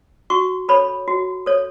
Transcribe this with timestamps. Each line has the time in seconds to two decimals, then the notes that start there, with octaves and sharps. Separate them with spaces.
0.30 F#4 C#6
0.69 A4 C#5 B5
1.08 F#4
1.46 A4 C#5